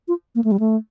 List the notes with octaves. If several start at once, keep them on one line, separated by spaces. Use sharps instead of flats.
F4
A#3
A3
G3
A3